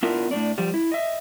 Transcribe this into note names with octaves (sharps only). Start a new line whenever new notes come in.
B3 D4 E4 F4 A#4
A2 C#4 D4 D5
F3 G3
E4
D#5 E5